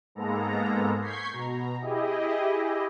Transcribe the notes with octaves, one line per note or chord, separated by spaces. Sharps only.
G#2 G#3 A#3 B3 A4 A#5
C#6 G6 G#6 B6 C7
B2 A#5
E4 G4 G#4 D#5